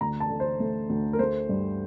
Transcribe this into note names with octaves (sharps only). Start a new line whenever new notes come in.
D2 A#5
A5
D3
C5
A3
D2
A#4
A3 C5
G2